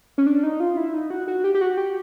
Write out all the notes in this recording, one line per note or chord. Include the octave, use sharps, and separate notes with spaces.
C#4
D4
D#4
F4
E4
D#4
F#4
F#4
G4
G4
F#4
G4